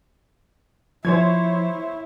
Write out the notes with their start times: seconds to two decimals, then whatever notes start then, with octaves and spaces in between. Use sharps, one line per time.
1.05 F3 E4 C5 C#5 G#6